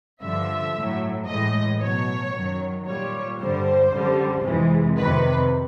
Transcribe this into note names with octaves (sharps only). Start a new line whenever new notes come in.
G2 D3 F3 E5
A2 F#3
A2 E3 G#3 D#5
B2 F#3 C#5
F#2 D#3 F#3
A#2 G3 C#5
G2 D3 G3 C5
F#2 D3 G3
F2 C3 E3 G#3
F2 C3 D#3 B4